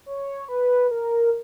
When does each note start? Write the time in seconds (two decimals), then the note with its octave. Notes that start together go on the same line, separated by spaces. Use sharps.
0.06 C#5
0.48 B4
0.91 A#4